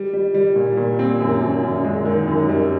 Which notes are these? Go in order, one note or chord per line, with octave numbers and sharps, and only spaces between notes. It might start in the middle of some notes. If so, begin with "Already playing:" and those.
Already playing: G3
G3
G3
A#2
A#2
C4
F#2
F#2
F#2
G#3
D#3
F#2
G3